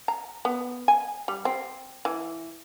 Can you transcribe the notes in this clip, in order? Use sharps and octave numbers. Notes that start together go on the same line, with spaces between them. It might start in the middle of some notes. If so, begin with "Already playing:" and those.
A#5
B3
G#5
G3
C4
E3